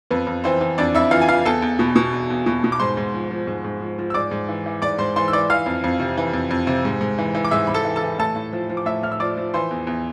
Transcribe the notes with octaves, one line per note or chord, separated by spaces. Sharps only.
F2 B3 B4
F2
E3 C4 C5
E3
F2 D4 D5
F2 E4 E5
E3 F4 F5
G#5
E3 F4 F5
E2 A4 A5
E2
B2
B2
E2
E2
B2
B2
D6
G#2 C5 C6
G#2
F3
F3
G#2
G#2
F3
F3
E6
G#2 D5 D6
G#2
E3
E3
G#2 D5 D6
G#2 C5 C6
E3 C5 C6
E6
E3 D5 D6
E3 F5 F6
F2
F2
C3
E3
F2
F2
C3
G#2
G#2
E3
E3
D6
G#2 E5 E6
G#2 B5
A4 A5
E3
A4 A5
E3
A2 A4 A5
A2
F3
F3
D6
A2 E5 E6
A2 F6
E6
F3 D5 D6
F3
E3 C5 C6
E2
E2